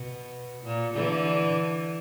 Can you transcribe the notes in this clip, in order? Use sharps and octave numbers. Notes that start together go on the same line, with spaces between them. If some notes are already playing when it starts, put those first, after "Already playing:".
Already playing: B2
A#2
D3 E3